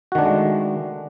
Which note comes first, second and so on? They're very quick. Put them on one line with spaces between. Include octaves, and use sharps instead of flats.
F#4 D#3 D4 A3 G#3